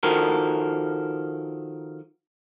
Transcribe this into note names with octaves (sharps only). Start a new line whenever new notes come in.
D#3 F3 F#4 A4 A#4